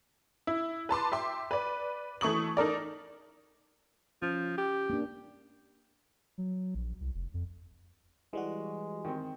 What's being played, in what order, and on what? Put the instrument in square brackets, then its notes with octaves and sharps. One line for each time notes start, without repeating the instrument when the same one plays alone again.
[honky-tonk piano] E4
B4 A5 C6 D6
E5 G5 C6 D6
B4 D5
E3 A3 C#6 D#6 F#7
D#4 A4 A#4 D5
[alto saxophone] F3 [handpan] C#4
[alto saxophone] G4
[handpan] A#3 D4
[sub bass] F#3
A#1
C2
F1
F2
[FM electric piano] E3 G3 F#4 [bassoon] G#3
[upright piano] D#3 C4